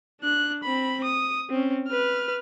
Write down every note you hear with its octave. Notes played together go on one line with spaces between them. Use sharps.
D4 F#6
C4 B5
D#6
C4 C#4
B4 F6